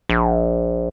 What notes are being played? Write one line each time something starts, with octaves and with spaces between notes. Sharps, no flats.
A#1